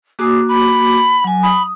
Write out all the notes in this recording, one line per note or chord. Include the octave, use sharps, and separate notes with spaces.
A#3 F#4 G#4 D6
B5
F#3 G#5
B5 D#6